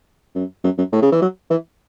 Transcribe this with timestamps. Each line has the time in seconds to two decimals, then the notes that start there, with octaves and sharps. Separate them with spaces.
0.35 F#2
0.64 F#2
0.78 F#2
0.92 A2
1.02 C#3
1.12 E3
1.22 F#3
1.50 E3